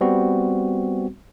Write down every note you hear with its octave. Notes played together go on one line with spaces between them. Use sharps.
G3 B3 C4 F#4